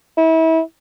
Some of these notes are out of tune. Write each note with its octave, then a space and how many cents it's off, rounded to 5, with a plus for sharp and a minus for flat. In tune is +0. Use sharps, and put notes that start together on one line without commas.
E4 -30